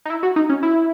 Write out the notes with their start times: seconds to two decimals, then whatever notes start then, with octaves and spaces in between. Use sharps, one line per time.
0.05 D#4
0.10 E4
0.23 F#4
0.36 D#4
0.49 C#4
0.63 E4